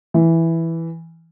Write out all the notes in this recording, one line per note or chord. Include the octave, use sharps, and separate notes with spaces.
E3